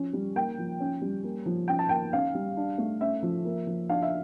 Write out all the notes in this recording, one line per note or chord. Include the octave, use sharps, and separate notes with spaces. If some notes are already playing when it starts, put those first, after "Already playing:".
Already playing: F3 C#4
G3
A#3 G5
F3
C#4
G3
A#3
F3
C#4 G5
A5
A#3 G5
C#4 F5
G3
D4
A3
C#4 E5
F3
A#3
F3
D4 F5
E5